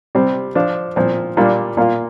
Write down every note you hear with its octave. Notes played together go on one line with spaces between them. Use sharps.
C3 G3 C4
F3 D4 F4
A#2 F3 C4
A#2 G3 A#3 D4 F4
A#2 A#3 F4